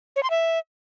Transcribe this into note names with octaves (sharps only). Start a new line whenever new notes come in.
C#5
C6
E5